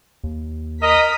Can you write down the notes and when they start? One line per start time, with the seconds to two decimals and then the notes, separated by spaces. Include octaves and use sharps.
0.24 D#2
0.82 A#4 D#5 A#5 D#6 B6